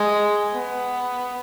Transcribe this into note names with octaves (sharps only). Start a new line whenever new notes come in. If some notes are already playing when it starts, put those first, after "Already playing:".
Already playing: G#3
B3